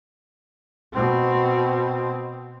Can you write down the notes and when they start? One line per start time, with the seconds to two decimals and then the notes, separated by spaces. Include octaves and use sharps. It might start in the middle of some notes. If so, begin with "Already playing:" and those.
0.93 B2 C4